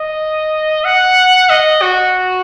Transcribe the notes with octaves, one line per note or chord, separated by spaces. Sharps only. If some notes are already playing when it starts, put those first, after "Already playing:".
Already playing: D#5
F#5
D#5
F#4